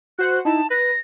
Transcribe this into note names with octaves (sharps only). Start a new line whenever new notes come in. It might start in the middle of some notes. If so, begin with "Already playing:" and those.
F#4 C5 F#5 F#6
D#4 E4 A5
B4 A#6